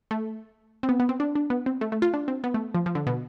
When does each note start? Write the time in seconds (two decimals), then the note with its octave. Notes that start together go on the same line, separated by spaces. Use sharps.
0.11 A3
0.83 C4
0.89 B3
1.00 B3
1.09 C4
1.20 D4
1.35 D4
1.50 B3
1.66 C4
1.81 A3
1.92 A3
2.02 F4
2.14 D4
2.28 C4
2.44 B3
2.54 A3
2.75 F3
2.86 F3
2.95 D3
3.07 B2